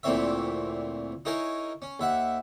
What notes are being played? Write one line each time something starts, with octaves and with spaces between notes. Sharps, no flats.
D2 A#2 E3 C4 C#5 E5
D#4 E4 G#4 A#4 C#5 G#5
C#4
D#2 E5 F#5